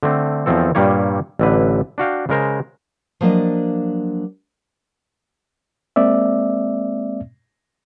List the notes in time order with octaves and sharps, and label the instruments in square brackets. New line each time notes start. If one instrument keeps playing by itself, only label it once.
[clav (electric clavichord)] D3 A3 C4
E2 D#3 F3 C4 A4
G2 A#2 G3 A#3 C#5
A1 D3 B4
D4 F#4 F5 G5
C#3 G#3 A#4 C5
[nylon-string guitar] F3 F#3 A#3 D4 D#5
[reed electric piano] G#3 A#3 C4 D5 E5